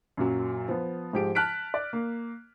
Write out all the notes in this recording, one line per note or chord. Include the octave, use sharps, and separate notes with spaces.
F#2 A#2 F#3
F3 B3
G#2 F3 G4 G#4 D7
A5 F6 F#6 B6 D7
D5
A#3